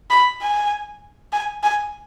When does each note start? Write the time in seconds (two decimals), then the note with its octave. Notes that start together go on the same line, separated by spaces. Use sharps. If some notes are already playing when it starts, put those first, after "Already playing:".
0.10 B5
0.42 G#5
1.33 G#5
1.63 G#5